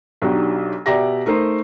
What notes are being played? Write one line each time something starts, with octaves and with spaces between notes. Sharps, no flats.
B1 F#3 D4 D#4 G4
B2 G4 D5 E5 A#5 A#6
A3 D#4 A#4 C5